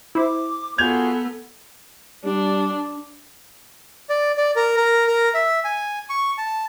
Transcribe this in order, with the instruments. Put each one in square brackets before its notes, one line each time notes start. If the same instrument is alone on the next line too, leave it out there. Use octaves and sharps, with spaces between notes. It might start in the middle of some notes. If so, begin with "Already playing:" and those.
[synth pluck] E4 C5 [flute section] D6
[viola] B3 A4 [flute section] F4 F#4 G#4 [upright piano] G6 G#6 F7
[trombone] G3 [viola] D4
[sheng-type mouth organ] D5
D5
A#4
A#4
A#4
E5
G#5
C#6
A5